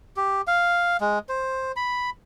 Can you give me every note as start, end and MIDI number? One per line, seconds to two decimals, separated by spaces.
0.17 0.42 67
0.47 0.97 77
1.01 1.19 56
1.29 1.72 72
1.76 2.10 83